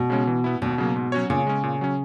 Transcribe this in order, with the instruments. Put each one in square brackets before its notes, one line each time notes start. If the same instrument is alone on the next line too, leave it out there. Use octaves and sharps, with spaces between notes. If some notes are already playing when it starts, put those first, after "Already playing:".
Already playing: [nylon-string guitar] B2
[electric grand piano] C#3 G#3 C#4
E3
B3 E4
[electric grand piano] D#2 [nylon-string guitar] B2
[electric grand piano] C#3 F#3 A#3
G#2
F#3 C#4 F#4 C#5
[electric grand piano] A#2 [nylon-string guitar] C#3
[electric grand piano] G#3 C#4
A#2
F#3 C#4